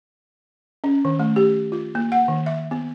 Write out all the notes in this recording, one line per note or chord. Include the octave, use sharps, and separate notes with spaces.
C#4
D#3
A3
G4
F4
A#3
F#5
D#3
E5
B3